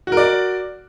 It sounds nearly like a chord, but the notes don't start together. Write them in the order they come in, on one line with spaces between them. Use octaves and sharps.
F#4 A#4 D5